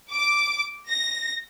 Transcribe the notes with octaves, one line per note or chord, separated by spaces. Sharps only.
D6
A#6